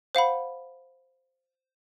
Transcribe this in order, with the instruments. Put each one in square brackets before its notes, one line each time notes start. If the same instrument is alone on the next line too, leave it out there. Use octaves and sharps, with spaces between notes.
[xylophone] C5 F5 F#5 B5